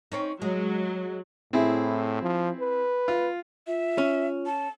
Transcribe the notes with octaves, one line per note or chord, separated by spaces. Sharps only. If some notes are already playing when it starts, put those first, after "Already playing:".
C4 C#4 D#4
F#3 G#3
A2 C4 E4 G#4
F3
B4
F4
F4 E5
C#4
A5